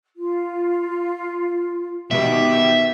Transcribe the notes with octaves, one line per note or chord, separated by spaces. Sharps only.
F4
B2 D#3 G4 E5